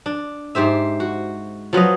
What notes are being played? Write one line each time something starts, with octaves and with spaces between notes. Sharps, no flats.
D4
G#2 G4 C5 E5
F#4
F3 F#3 B4 D#5